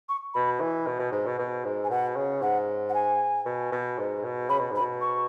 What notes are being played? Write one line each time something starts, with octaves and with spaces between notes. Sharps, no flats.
C#6
B2 B5
E3
B2
B2
G#2
B2
B2
G#2
G#5
B2 F#5
C#3
G#2 F#5
F#5
G#5
B2
B2
G#2
B2
C#3 B5
B2
G#2 B5
B2
C#6